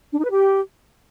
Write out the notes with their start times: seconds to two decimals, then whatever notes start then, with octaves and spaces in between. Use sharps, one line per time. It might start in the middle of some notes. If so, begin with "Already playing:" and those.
0.12 D4
0.18 D#4
0.24 B4
0.30 G4